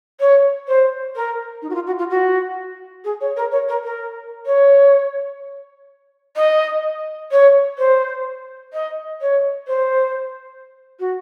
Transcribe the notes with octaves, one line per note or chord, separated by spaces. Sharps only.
C#5
C5
A#4
D#4
F#4
F4
F#4
F4
F#4
G#4
C#5
A#4
C#5
A#4
A#4
C#5
D#5
C#5
C5
D#5
C#5
C5
F#4